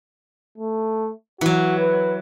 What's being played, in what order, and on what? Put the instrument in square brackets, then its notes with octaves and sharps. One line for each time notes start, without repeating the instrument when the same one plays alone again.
[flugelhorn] A3
[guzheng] E3 F#3 [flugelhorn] F#4
[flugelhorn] B4